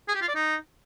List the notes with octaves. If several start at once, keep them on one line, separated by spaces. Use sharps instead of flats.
G#4
G4
F4
D5
D#4